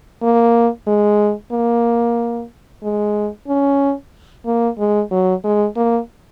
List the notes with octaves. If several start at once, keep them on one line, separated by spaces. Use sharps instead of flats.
A#3
G#3
A#3
G#3
C#4
A#3
G#3
F#3
G#3
A#3